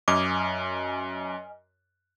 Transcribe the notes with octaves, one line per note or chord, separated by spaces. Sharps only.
F#2 D#5 G#5 D6 F6